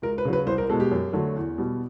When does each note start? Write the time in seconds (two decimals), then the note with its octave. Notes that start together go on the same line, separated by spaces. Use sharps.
0.02 C#2 A#4
0.18 B4
0.25 C#3 F#3
0.33 B4
0.47 C2 C5
0.58 A#4
0.70 B2 G#3 A4
0.80 G4
0.91 F#2
1.13 D3 F#3 A3
1.36 E2
1.58 B2 G3